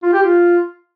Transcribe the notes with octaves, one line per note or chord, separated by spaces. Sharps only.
F4
G4
F4